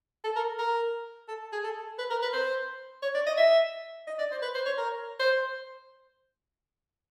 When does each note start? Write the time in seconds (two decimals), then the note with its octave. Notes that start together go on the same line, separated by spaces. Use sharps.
0.24 A4
0.36 A#4
0.59 A#4
1.28 A4
1.52 G#4
1.64 A4
1.98 B4
2.10 A#4
2.22 B4
2.33 C5
3.02 C#5
3.14 D5
3.26 D#5
3.37 E5
4.07 D#5
4.19 D5
4.31 C5
4.42 B4
4.54 C5
4.65 C#5
4.77 A#4
5.20 C5